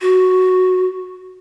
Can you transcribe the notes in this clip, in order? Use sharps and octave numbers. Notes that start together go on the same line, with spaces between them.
F#4